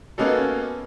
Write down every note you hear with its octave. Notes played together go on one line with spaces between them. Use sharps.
A#3 B3 C#4 D#4 F#4 A4